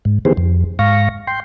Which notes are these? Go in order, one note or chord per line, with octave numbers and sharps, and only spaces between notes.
G#2
D#3 E3 B3 G4 G#4 C5
F2
G#2 F5 C#6 A#6
G5 C6